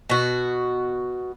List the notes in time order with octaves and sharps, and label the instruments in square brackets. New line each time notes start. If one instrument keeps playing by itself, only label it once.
[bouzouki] B2 F#4